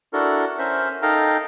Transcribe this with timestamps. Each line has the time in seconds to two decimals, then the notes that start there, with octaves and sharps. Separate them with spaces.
0.13 D4 E4 F#4 A4 A#4
0.59 C#4 A#4 C5 E5
1.02 D#4 A4 A#4 F5 G5 A#5